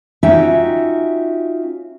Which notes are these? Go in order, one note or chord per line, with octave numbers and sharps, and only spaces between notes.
C#4 D#4 F4 F#4 E5 G5